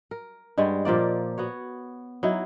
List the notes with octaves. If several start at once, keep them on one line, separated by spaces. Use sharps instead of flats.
A#4
G2 G3 G#3 F#5
A#2 F3 A#3 D5
B3 F#4 C#5
F#3 D#4 E4